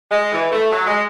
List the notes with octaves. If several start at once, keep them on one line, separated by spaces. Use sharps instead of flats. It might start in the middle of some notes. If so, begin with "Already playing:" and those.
G#3
E3
A3
F#3
G#3